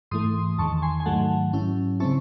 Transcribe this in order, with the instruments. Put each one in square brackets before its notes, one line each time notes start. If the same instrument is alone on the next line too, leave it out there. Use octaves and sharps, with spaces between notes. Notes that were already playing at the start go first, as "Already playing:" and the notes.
[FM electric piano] G#2 E3 A3 C6 D#6
E2 D#3 G#3 A5 C#6
G#5 C6
G#5
G#2 D#3 F#3 A3 F#5 A5
G#2 F#3 C#4 E4
C#3 G#3 C4 E4 A5 C#6